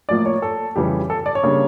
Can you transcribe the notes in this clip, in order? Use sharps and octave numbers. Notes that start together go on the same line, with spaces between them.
A2 F3 A#3 D5
C#5
A4
F2 C#3 E3 G3 G4
A4
D5
C#5
C#3 G3 A#3 D4